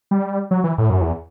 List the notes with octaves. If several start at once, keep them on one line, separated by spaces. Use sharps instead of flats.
G3
F#3
E3
A2
F#2
E2